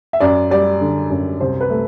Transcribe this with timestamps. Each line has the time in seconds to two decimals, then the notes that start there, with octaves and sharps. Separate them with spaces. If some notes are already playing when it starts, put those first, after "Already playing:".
0.13 E5
0.20 F#2 D5
0.50 G3 D5
0.81 D3
1.10 F#2
1.40 C2 C5
1.61 B4
1.70 A3